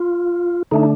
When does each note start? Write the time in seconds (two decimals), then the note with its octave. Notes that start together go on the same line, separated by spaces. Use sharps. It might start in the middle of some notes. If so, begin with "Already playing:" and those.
Already playing: F4
0.71 D3 A3 D4 D#4